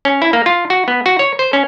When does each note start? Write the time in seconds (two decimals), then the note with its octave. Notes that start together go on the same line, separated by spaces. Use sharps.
0.05 C#4
0.22 E4
0.33 A#3
0.46 F4
0.70 F#4
0.88 B3
1.06 F#4
1.19 C#5
1.39 C5
1.53 C#4